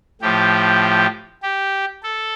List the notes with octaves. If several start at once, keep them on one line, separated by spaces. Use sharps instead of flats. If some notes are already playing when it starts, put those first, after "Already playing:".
A2 F3 G4
G4
A4